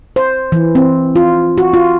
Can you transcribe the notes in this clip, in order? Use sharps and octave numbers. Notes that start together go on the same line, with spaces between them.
C5
E3
C4
F4
F#4
F4